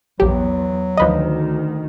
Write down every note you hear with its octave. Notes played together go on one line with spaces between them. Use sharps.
A#1 E2 F#3 G4
D2 D#3 F3 B4 D#5